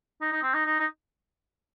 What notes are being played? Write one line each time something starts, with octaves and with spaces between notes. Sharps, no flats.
D#4
D#4
C4
D#4
D#4
D#4